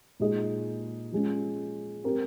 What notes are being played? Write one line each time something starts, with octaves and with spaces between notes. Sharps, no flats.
A#2 G#3 D#4 G#4 D#5
F3 G#3 C#4
C4 G4 A#4